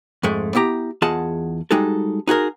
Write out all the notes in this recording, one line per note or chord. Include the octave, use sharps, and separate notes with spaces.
F2 G#2 G#3 A3
B3 E4 G4 A#5
E2 F4 G#4 D#5 F#5 A5
G3 G#3 D#4 F#4 A4
D#4 F#4 G#4 A#4